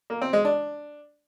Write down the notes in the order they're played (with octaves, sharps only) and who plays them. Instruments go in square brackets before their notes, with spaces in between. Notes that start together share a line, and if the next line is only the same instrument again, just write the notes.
[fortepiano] A#3
C4
G#3
D4